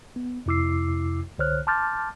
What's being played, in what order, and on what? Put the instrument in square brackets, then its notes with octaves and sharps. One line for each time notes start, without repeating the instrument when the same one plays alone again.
[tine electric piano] B3
F2 C3 E4 D6 E6 C7
C2 D3 C5 C#5 F6 F#6
A5 C6 D6 F6 G6 A6